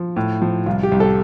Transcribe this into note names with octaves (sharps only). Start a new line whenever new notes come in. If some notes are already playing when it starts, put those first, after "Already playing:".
Already playing: F3
A2
F3
C2 F4
G4
C2
A4